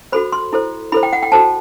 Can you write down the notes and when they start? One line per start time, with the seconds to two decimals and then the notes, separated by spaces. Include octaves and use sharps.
0.12 F#4 A4 C5 B5
0.32 C6
0.53 E4 A4 C5
0.92 E4 A4 C5 B5
1.03 G5
1.13 F#5
1.23 G5
1.32 F#4 A4 C5 A5